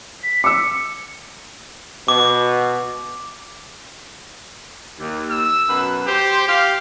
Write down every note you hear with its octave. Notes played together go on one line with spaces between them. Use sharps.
B6
D6 E6 C#7
B2 D6
D#2
E6
F#2 B2 B4
G4 C5
G4 F5